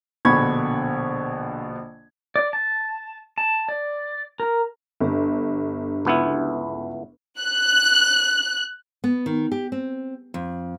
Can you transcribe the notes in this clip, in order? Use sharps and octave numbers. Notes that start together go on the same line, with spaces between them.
A#1 B2 D3 B5 C#6 G#6
D5
A5
A5
D5
A#4
G1 D4 G4
C#2 B3 E4
F#6
B3
D#3
G4
C4
F2